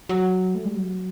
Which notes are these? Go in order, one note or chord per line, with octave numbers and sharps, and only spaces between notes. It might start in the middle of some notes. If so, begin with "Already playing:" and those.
F#3
A3
G3
F#3